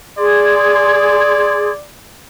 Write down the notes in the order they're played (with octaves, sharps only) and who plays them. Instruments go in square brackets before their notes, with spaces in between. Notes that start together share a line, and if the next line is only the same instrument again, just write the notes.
[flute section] G#4 C6 G#6 [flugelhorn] D5